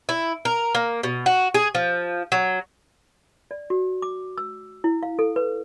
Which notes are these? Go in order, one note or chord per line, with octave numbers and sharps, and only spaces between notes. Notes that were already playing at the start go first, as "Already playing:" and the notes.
E4
A#4
A#3
B2
F#4
G#4
F3
F#3
D5
F#4
D6
E6
E4
F5
A4
B4